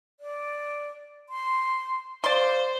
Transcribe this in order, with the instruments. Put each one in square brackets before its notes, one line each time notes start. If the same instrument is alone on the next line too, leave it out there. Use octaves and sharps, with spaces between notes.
[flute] D5
C6
[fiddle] C5 [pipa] D5 C6 [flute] F5